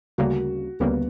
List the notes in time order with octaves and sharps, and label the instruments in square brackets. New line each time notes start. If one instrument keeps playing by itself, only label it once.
[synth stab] D2 C#3 G3 A#3 [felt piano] F#4
[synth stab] D2 C#3 G3 A#3 [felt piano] B3